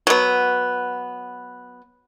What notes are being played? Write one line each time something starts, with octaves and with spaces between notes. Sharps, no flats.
F#3 B3